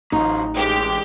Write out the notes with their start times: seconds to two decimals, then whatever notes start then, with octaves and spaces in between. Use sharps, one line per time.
0.12 A1 F#3 D#4 F4
0.56 E3 G#3 G4